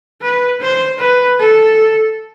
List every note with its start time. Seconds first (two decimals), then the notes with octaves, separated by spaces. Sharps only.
0.22 B4
0.61 C5
0.99 B4
1.39 A4